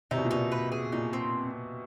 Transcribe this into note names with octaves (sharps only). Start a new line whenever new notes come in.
C3 D#4
B2
A#2
B2 D#4
B4
G#4
A#2 D#4
C4